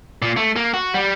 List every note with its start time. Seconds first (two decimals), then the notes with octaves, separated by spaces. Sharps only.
0.22 A#2
0.37 A3
0.56 A#3
0.74 F#4
0.94 G3